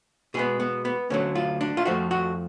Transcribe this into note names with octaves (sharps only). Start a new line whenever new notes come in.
B2 G#3 B3 G#4
B3
B3
D2 D3 F#3 C#4
F4
D4
F4
F2 F3 A3 F#4
F#4